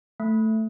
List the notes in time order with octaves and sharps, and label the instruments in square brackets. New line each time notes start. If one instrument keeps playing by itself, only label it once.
[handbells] A3